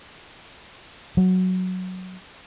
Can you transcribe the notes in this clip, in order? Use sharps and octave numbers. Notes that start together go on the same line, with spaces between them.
F#3